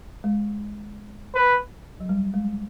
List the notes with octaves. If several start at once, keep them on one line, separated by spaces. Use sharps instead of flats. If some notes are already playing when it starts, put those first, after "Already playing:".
G#3
B4
F#3
G3
G#3